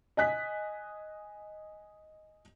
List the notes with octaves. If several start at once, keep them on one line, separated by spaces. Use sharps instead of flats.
D#5 G#5 F#6 B6